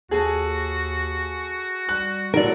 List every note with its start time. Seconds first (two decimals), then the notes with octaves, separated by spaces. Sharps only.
0.11 D#2 F#4 G#4 A4 G#5
1.89 G3 F#6
2.34 A2 D3 F#3 A#4 D5